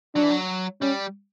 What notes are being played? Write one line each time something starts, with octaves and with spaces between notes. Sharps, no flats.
F#3 D4
E3
F#3
G3 C#4